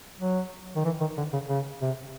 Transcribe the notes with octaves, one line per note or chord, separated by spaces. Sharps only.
F#3
D#3
E3
D#3
D3
C#3
C#3
C3